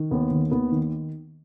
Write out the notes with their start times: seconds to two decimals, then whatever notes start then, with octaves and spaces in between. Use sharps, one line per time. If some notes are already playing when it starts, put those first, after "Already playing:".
Already playing: D#3
0.11 D#2 B3
0.31 D#3
0.51 D#2 B3
0.72 D#3